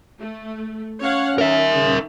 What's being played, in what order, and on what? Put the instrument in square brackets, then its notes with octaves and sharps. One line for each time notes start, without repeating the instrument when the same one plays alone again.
[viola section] A3
[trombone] C#4 [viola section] C#5 F5 F#5
[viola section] D#3 [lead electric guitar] A#4 E5
[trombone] C#3